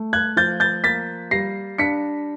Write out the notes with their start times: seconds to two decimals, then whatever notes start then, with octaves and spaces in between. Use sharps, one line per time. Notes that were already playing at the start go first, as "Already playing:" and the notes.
Already playing: A3
0.13 F#6 G#6
0.36 F3 G6 A6
0.60 G6 A6
0.84 A#3 A6 B6
1.31 G3 A#6 C7
1.78 D4 B6 C#7